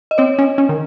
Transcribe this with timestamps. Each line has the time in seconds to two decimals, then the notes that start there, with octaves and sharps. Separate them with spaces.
0.11 D#5
0.18 C4 C#5
0.39 C#4
0.58 C#4
0.69 D#3